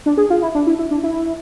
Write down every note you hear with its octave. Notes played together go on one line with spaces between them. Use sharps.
D4
G#4
F4
E4
D4
E4
E4
D4
E4